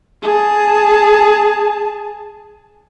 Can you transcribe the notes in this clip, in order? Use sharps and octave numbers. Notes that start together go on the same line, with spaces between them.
G#4 A5